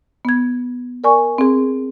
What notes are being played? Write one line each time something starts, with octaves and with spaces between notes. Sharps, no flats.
B3 G#6
A#4 D5 G#5 C#6
C4 G#4